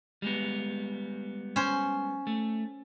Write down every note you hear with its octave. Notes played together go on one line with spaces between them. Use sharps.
G3 G#3 B3
C#4 C5
A3